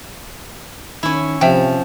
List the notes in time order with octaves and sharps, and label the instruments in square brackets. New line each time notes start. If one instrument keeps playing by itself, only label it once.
[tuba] D#3 [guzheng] C#4 E4
[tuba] C3 [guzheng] F3 [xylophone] E5 G5